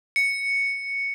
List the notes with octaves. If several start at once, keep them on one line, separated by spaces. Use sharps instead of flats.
C#7